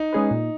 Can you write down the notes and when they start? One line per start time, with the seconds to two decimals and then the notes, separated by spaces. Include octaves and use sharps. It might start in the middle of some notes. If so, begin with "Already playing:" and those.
Already playing: D#4
0.13 G#3 C#4 G#4 B4
0.31 A#2